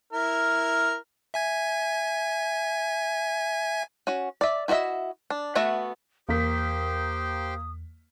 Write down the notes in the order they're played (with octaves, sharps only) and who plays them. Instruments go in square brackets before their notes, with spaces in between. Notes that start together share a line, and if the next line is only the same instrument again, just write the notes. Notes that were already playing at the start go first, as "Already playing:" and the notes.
[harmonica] E4 A#4 F6
[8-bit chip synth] E5 G#5 G#6
[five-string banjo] C#4 F#4
D5 E5
E4 F#4 C#5 D#5 E5
D4
A3 B3 F#4 E5 F#5
[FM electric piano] E2 [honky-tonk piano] A#3 B6 [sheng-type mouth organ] G4 C5 G5 [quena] D#6